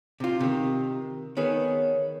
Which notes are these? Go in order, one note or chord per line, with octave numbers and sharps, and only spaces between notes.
C3 F4
C3 D#3
D#3 B3 G#4 C#5